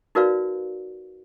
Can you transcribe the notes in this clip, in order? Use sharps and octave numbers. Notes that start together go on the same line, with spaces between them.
D#4 F#4 A#4 B4 D5 F5